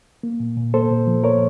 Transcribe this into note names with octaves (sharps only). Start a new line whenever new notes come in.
A#3
A#2
A#2
A#3 A4 C5
A#2
F3
A#3 A#4 C#5